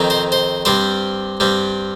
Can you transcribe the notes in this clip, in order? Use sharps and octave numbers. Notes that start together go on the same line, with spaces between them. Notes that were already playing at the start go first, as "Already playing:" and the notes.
Already playing: F2 D#3 C4
C5
C5
G2 G3 C4 C5
G2 G3 C4